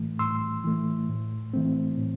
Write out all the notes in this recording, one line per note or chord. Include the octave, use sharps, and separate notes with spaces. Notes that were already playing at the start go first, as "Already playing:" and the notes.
Already playing: A2 E3 A3
A2 C6 E6
E3 A3
A2
E3 A3 C4
A2